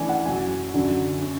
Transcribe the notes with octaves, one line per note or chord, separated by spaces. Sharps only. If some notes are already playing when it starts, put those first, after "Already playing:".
Already playing: C#3 E3 A3 D4 G#5
F#5
F#2 C#3 F#3 G#5
F#2 D3 F#3
C#4